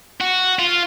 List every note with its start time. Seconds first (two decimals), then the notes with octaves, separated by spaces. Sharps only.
0.20 F#4
0.59 F4